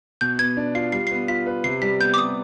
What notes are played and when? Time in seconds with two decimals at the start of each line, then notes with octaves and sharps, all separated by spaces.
0.21 B2 G6
0.39 B3 G#6
0.57 D4
0.75 F4 C7
0.92 G3 C7
1.07 B3 C7
1.28 F4 B6
1.46 B4
1.64 C3 C7
1.82 G3 B6
2.00 B3 G6
2.14 D6
2.18 C3 D#6